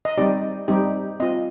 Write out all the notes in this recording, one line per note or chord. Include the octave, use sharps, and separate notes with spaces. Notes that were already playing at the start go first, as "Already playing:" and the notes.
D#5
G3 C4 D#4 G4 D5
G3 C4 D#4 G4
C4 F4 D#5